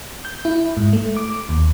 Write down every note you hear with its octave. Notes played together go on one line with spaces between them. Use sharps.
G6
E4
G#2
A3
D6
D#2